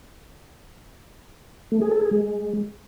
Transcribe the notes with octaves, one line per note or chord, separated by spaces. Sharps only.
A3
G#4
A4
G#4
G#3